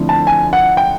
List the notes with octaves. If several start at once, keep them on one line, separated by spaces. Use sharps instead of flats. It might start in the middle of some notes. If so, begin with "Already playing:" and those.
Already playing: D3 F3 A3 C4 E4
A5
G#5
F#5
G5